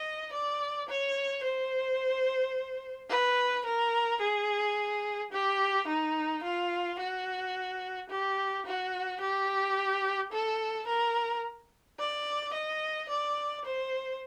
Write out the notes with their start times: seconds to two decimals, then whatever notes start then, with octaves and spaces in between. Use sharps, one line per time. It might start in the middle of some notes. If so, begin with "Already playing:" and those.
Already playing: D#5
0.32 D5
0.89 C#5
1.43 C5
3.10 B4
3.66 A#4
4.21 G#4
5.32 G4
5.87 D#4
6.43 F4
6.99 F#4
8.10 G4
8.66 F#4
9.20 G4
10.32 A4
10.87 A#4
11.99 D5
12.54 D#5
13.09 D5
13.65 C5